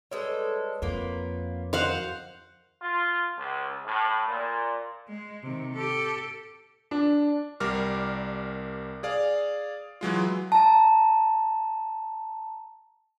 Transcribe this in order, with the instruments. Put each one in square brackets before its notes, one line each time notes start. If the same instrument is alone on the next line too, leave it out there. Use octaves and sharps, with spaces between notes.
[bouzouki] G3 G#3 A4 [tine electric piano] B4 C#5
[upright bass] F2 [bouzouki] A#3 B3 F4
[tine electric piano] F#4 A#4 D#5 [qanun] C5 F5 F#5
[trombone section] F4
C#2
A2
A#2
[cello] G#3
C3 D#3
G4 A4
[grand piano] D4
[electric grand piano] C2 G3 A#4 D6 F6
G#4 D5 F5
E3 F#3 G#3 F4
[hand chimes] A5 A#5